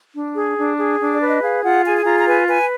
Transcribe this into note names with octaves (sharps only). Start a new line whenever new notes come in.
D4
G#4
D4
G#4
D4
D5
B4
D#5
G#4 F5
F4 F#5
G#4 G#5
G#5
F4 A#5
A#5
B4 G#5
B4 G#5